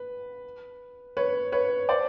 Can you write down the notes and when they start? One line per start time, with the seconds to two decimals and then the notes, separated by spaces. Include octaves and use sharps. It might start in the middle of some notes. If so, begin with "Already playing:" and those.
Already playing: B4
1.17 B4 C#5
1.52 B4 C#5
1.89 C5 D5